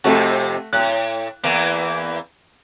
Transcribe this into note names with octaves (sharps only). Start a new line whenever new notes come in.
F2 C3 A3 F#4
A2 F#6
E2 E3 A#3